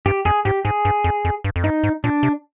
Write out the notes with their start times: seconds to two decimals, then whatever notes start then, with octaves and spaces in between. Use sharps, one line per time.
0.06 G2 G4
0.25 F2 G#4
0.45 G#2 G4
0.65 G#2 G#4
0.85 G2
1.04 F2
1.25 F2
1.44 G2
1.56 F2
1.64 G2 D#4
1.83 G#2
2.04 A#2 D4
2.23 C3